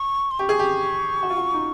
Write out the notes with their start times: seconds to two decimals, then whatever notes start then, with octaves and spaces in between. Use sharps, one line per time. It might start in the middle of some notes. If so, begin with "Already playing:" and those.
Already playing: C#6
0.31 C6
0.39 G4 C#6
0.49 G#4
0.59 G4
1.23 F#4
1.30 F4
1.37 F#4
1.53 D#4